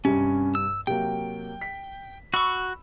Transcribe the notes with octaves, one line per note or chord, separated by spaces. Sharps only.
G2 C3 C#4
E6
C3 F#3 A#3 G5
B6
F#4 B5 C#6 E6